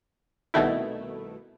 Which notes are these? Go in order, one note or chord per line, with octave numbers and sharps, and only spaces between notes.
C2 B2 D#3 A3 E4